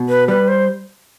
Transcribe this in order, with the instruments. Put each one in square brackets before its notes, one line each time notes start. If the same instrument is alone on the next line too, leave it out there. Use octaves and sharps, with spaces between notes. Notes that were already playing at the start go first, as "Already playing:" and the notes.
Already playing: [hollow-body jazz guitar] B2
[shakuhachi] B4
[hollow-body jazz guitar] G3 [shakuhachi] B4
[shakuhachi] C5